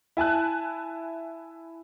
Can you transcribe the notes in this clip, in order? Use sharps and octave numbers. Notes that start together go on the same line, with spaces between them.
E4 G#5 A5 F#6